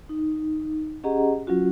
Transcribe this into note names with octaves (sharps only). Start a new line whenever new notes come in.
D#4
C#4 G4 G#4 D#5 F#5 A#5
F#3 C#4 F4 F#4